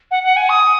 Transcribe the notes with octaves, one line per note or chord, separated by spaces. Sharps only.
F#5
F#5
G#5
D#6